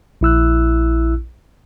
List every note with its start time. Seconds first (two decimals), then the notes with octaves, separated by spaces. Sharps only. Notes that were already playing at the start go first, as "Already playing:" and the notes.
0.21 A#1 E4 E6 F#6